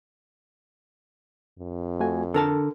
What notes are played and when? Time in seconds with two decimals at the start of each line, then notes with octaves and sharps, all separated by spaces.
1.59 F2
2.00 A3 F#4 G#5
2.34 D3 A4 A#4 A5